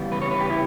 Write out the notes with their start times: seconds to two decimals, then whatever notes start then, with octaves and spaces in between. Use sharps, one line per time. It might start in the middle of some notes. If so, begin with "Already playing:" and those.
Already playing: C#3 E3 G3 B3
0.12 B4
0.21 C#5
0.31 B4
0.41 G4
0.50 E4